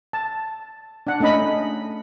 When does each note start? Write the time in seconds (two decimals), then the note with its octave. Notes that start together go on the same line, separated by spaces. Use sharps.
0.13 A5
1.07 D4 F#5
1.20 A3 C#4 D#4 D#5 B5